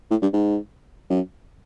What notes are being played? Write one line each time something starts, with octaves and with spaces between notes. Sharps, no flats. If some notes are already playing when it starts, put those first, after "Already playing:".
A2
G2
G#2
F#2